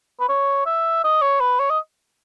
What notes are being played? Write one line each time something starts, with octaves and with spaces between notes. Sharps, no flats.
B4
C#5
E5
D#5
C#5
B4
C#5
D#5